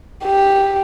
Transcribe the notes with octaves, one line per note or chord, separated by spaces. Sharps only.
G4